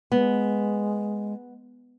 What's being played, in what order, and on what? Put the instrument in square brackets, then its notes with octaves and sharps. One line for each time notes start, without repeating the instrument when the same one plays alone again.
[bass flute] G#3 [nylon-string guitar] B3